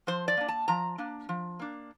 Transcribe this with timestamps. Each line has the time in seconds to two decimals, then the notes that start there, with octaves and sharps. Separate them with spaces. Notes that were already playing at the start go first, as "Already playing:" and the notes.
0.07 F3 C5
0.28 D5
0.37 A#3 D4
0.48 A5
0.68 F3 A#5
0.98 A#3 D4
1.29 F3
1.59 A#3 D4